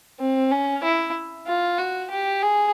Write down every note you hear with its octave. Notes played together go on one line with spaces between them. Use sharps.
C4
C#4
E4
F4
F#4
G4
G#4